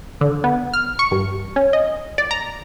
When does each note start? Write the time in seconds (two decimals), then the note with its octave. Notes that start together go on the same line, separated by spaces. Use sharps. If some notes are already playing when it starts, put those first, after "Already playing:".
0.21 D3
0.44 B3
0.74 F6
0.99 C#6
1.11 G2
1.56 C#4
1.73 D#5
2.18 D5
2.31 A#5